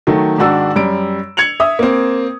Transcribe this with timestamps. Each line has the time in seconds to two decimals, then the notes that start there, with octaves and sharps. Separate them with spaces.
0.07 D#3 F#3 A3
0.38 G#2 D#3 D4 F#4 E6
0.76 F#2 G3 D7
1.37 G#6 C#7 F7 F#7
1.60 E5 D#6
1.79 A#3 C4